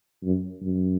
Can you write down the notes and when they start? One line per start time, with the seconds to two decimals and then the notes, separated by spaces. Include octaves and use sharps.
0.23 F#2
0.61 F#2